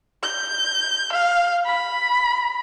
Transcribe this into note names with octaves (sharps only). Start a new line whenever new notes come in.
G6
F5
B5